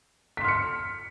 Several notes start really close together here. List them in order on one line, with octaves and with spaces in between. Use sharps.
B6 C6 F6 C#7